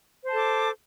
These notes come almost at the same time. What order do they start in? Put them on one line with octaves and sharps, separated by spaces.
C5 A5 A4 D6